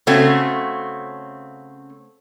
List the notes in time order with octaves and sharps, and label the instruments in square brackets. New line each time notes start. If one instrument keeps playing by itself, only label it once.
[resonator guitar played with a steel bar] C#3 A3 C4 C#4 F#4